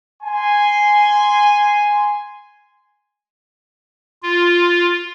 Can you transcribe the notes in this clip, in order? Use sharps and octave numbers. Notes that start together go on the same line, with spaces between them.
G#5 C6
F4